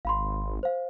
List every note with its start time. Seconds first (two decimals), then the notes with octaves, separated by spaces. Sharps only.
0.05 G#1 F5 B5 C6
0.63 C5 F5